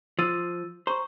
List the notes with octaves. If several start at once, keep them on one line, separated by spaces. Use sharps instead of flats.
F3 E6 A6 D#7
C5 A#5 C#6